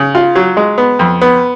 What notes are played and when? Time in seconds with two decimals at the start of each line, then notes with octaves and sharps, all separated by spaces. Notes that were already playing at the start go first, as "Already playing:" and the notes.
Already playing: C#3
0.15 F4
0.35 F#3
0.57 G#3
0.78 B3
0.99 F2
1.21 B3